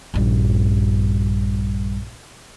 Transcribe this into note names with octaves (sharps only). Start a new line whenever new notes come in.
A#1 G2